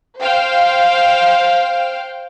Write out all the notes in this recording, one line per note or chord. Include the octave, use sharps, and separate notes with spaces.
C5 F5 G5